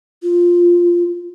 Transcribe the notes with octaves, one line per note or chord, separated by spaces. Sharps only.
F4